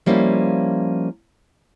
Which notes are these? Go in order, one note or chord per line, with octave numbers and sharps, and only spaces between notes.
F3 G3 A#3 C#4 E4